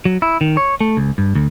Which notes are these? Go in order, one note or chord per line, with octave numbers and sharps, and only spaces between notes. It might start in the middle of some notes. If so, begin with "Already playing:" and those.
F#3
E4
D#3
C#5
A3
C#2
G2
D2